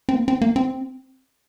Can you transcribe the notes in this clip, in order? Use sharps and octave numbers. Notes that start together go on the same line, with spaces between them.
C4
A#3
C4
A#3
C4